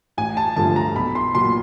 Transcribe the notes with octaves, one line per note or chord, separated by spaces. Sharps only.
A1 G#5
A5
G2 D3 F3 A3 A5
A#5
B1 B5
C6
A#2 F#3 C6